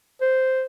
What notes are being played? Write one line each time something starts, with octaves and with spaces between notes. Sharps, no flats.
C5